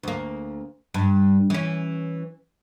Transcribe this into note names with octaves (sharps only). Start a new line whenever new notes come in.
D2 A#3
G2
E3 C#4